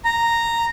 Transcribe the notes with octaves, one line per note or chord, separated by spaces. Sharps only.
A#5